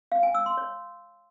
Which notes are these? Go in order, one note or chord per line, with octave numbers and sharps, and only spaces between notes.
F5
G#5
E6
C6
C#5